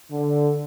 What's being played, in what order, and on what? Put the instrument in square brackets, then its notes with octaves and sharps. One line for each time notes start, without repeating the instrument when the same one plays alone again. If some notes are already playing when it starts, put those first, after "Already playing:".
[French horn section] D3